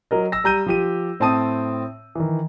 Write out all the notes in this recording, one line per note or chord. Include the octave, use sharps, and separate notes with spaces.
F#3 A#4 D#5
E6 A#6
G3 A#5 G6 D#7
F3 G4 D#7
A2 C4 G5 A5 D#6 D#7
D#3 E3